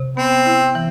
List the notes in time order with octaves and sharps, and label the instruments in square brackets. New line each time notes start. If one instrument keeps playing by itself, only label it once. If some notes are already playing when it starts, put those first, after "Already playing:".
Already playing: [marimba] C3
[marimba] B3 [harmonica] C4
[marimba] E4
E3